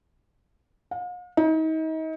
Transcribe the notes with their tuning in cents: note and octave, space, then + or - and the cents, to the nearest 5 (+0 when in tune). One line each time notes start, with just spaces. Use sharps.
F5 +45
D#4 +35